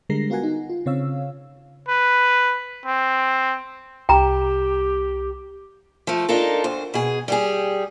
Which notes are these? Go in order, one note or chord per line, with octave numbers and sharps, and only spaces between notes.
D3 G3 G#3 A#4 A#6 C7
B3 F4 F#4 A#4 F#5 G#5
D#4
F4
C#3 C4 C#5 F5 E6
B4
C4
C2 G4 G5 A#5
F3 A3
D4 D#4 F4 A4 A#4
D2 C5
B2 G#4
G3 G4 G#4